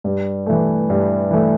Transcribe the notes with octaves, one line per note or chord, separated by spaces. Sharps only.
G2
E3 A3
G2
E3 A3